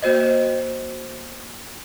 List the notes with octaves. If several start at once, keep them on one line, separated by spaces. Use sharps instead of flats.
A#3 F#4 C5 D#5